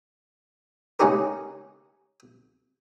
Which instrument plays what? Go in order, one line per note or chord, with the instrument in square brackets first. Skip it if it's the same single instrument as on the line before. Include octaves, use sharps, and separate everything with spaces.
[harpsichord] C#3 G#3 C#4 D#4 G4 A#4